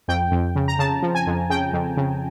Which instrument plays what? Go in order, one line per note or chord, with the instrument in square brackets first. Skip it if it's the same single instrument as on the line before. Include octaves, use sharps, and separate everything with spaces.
[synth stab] F2 G5
F2
C#3
A#5
C#3 A5
F3
G#5
F2
C#3 G5
F2
C#3